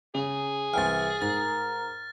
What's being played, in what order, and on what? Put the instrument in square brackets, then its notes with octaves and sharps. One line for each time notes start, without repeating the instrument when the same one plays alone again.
[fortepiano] C#3 [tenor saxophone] G#4
[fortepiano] C2 G5 G#5 [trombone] E3 [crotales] F6 A6
[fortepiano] G#2 [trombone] A#4 [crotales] A6